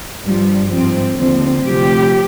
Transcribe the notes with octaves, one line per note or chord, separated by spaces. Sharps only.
G2 F3 G3
G#2 F3 C4
D#2 D3 F3 C4
D2 C3 F3 G4